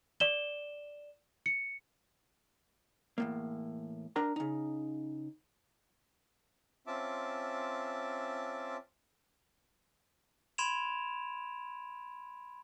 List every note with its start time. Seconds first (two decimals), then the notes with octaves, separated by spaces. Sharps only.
0.20 D5 E7 G7
1.46 C#7
3.18 E2 A2 A#3
4.16 D4 A#4 A#5
4.36 C#3 D#4
6.87 C4 C#4 F4 E5 A5 D6
10.58 B5 C6 G#6 D7 E7 F7